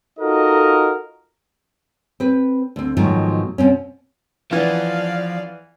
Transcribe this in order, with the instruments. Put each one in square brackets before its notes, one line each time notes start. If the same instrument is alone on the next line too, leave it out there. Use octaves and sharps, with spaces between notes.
[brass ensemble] D#4 F4 F#4 A4 A#4 D#5
[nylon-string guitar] C4 B4
D2 C4
G#2 B2 D#3 F3 F#3 A3
B2 C4 C#4
[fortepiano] E3 B3 [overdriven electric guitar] F3 [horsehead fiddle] D5 F5